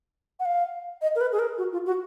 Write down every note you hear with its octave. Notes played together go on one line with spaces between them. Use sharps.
F#5
F5
D#5
A#4
B4
G#4
A#4
F#4
F4
F#4